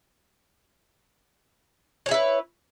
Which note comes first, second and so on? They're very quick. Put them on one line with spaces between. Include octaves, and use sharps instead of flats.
C#5 G#4 E4 B4